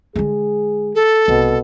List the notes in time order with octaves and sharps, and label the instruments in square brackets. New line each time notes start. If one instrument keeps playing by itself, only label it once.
[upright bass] D3 G#3 [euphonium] G#4
[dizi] A4
[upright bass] C2 [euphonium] B2